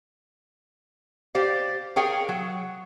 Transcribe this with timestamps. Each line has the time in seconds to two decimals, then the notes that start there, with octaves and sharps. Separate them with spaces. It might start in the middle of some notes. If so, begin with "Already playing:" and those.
1.35 G4 C5 D5 F5
1.96 G#4 A#4 C#5 F5 G5
2.29 F#3